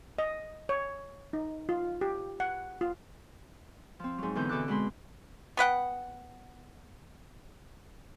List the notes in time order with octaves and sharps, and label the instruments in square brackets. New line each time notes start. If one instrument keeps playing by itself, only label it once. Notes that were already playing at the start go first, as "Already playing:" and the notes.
[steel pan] D#5
C#5
D#4
F4
G4
F#5
F4
[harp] F3 C4
G#2 F#3
E2 D3 E3 G6
B2 D3 A4 D6 F#6
B2 G#3 B5 C6
[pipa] B3 B4 F#5 G5